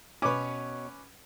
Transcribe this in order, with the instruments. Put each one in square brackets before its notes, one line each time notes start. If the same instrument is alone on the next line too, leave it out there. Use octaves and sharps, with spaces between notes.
[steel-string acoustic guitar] B2 C#5 [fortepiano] C#4 B4 [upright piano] D6